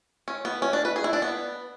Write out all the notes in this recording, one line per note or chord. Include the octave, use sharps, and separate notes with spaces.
C#4
B3
C#4
D4
B4
G#4
E4
D4
B3